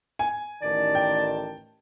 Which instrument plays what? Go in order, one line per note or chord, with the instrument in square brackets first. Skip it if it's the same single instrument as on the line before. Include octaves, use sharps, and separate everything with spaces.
[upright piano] G#5
[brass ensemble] A1 D#3 A5 [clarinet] D5
[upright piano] G5